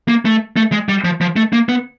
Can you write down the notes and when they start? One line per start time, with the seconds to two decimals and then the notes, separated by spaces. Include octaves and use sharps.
0.08 A#3
0.25 A3
0.57 A3
0.72 G#3
0.89 G3
1.05 F3
1.21 F3
1.36 A3
1.53 A#3
1.69 B3